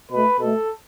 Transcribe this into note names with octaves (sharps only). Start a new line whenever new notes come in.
B2 A3 B4
B2 A3 A4